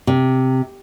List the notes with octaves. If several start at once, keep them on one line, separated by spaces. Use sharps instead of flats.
C3